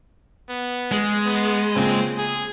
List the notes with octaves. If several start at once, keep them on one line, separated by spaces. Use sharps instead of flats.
B3
G#3 G#4
B3
A#2 C#3 C4 G#5
G#4